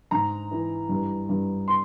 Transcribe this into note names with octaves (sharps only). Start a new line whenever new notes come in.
G#2 A#5
E3
G2
G2
C6